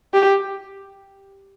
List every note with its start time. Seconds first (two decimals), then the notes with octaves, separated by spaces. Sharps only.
0.14 G4